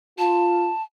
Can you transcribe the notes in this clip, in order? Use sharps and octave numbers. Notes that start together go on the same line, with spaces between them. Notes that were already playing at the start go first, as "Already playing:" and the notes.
F4 A5